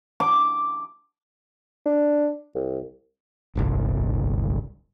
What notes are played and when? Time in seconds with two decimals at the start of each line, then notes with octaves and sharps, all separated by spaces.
0.20 D6
1.86 D4
2.55 C2
3.55 D1 G1 C2